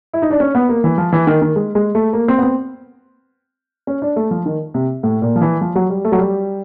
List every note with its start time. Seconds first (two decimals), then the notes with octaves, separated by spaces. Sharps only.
0.13 E4
0.22 D#4
0.31 D4
0.40 C#4
0.55 B3
0.69 A#3
0.84 E3
0.98 F3
1.12 E3
1.27 D#3
1.42 D#3
1.56 G#3
1.75 G#3
1.95 A3
2.13 A#3
2.28 C4
2.38 B3
2.43 C4
3.87 C#4
4.02 D4
4.16 A3
4.31 F3
4.46 D#3
4.74 C3
5.03 A2
5.22 A#2
5.36 F3
5.41 E3
5.61 F3
5.76 F#3
5.90 G3
6.05 A3
6.12 F#3
6.18 G3